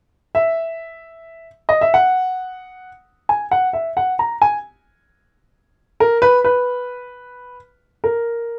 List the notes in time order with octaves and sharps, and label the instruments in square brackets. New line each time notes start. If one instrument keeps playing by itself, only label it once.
[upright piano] E5
D#5
E5
F#5
G#5
F#5
E5
F#5
A#5
G#5
A#4
B4
B4
A#4